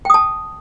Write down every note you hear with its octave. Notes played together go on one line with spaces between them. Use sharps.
G5 A5 D#6